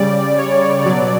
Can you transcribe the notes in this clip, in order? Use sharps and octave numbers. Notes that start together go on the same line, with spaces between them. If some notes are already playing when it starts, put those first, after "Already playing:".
Already playing: C#3 G3 D5
C#5
B2 F#3 D5